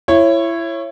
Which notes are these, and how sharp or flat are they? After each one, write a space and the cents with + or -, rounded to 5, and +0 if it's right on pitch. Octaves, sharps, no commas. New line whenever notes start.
E4 +25 C#5 -15